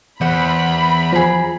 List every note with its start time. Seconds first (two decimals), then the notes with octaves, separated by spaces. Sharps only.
0.21 E2 C5 F#5 B5
1.13 F3 G#4 A#5